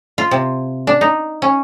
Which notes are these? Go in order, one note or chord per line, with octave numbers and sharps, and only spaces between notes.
F4
C3
D4
D#4
C#4